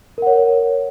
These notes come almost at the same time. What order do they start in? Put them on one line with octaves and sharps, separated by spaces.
A#4 F#5 C#5